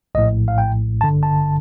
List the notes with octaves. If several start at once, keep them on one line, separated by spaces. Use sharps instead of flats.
A#1 A2 D#5
F5
G5
A1 G2 D3 A5
A5